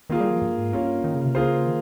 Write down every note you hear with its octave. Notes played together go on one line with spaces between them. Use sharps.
D#3 A#3 F4 G#4
G3
F3
G2
G#2
G2 A#3 C#4 F4
D#3
C#3
C3
C#3 A#3 F4 G#4 C5
D#3